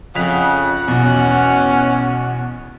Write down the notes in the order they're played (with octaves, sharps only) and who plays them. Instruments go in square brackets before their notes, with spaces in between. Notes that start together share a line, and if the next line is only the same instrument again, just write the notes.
[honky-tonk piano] F2 B6 F7 [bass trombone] C#3 [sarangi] F#5
[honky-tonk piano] E2 B2 [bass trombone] C#4